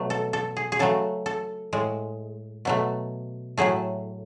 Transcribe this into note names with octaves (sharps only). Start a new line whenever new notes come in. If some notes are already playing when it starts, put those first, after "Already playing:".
Already playing: B2 F#3 A3 B4
A4
A4
G#4
G#4
C#3 F#3 A3 A4
A4
A2 G#3
B2 F#3 A3
A2 F#3 A3 G#4